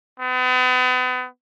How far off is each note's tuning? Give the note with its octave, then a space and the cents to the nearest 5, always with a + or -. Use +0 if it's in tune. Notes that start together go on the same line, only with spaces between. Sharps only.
B3 +40